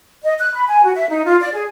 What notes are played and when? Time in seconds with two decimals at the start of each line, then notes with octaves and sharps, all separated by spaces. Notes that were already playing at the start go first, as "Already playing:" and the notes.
0.23 D#5
0.40 F#6
0.55 B5
0.68 G#5
0.84 F#4
0.95 E5
1.10 D#4
1.25 F4
1.41 D5
1.54 G#4